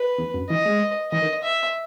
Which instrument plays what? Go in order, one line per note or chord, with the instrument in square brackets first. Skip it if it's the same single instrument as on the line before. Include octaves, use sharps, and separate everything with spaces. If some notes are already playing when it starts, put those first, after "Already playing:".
Already playing: [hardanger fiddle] B4
[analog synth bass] E2
F#2
[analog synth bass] E3 [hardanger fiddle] D#5
[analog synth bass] G#3
[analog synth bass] E3 [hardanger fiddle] D#5
[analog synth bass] D#3
[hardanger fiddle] E5